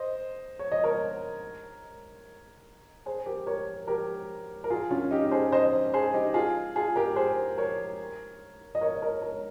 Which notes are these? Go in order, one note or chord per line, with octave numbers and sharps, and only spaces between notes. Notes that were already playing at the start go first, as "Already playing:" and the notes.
Already playing: C5 D#5
C#5
D#5
A#4 C#5
G#4 C5
G4 A#4
A#4 C#5
G4 A#4
A#4
F4 G#4
C#4 F4
D#4 G4
G#4 C5
C5 D#5
G#4 C5
D#4 G4
F4 G#4
F4 G#4
G4 A#4
G#4 C5
A#4 C#5
D#5
A#4 C#5
D#5
A#4 C#5
A#4 C#5